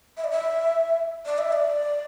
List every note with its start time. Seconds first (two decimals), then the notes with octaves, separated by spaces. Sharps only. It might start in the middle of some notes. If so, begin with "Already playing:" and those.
0.17 E5
0.24 D5
0.31 E5
1.26 D5
1.38 E5
1.52 D5